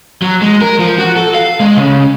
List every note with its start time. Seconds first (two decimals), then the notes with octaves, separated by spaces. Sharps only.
0.22 F#3
0.42 G#3
0.61 A#4
0.79 F3
0.98 F#4
1.16 A4
1.34 F5
1.60 G#3
1.76 C#3